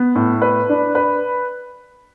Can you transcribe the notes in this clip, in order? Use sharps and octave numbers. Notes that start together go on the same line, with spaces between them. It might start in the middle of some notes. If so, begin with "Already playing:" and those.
Already playing: B3
A2
B4
D4
B4